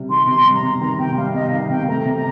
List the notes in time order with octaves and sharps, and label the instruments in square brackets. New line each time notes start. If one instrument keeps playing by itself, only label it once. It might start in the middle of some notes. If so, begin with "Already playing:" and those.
Already playing: [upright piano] C3 G3
[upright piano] D#3 [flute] C6
[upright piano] C3 [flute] C6
[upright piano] G3
[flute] A#5
[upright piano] C3
[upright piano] D#3 [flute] A#5
[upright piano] C3 [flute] G5
[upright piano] G3 [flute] F5
[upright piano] C3 [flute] D#5
[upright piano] D#3 [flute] F5
[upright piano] C3 [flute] G5
[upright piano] A3 [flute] A#5
[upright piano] C3
[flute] A#5